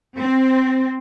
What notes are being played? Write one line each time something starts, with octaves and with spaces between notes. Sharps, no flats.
C4